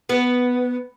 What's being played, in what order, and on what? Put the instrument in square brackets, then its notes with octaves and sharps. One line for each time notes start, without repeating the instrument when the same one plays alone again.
[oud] B3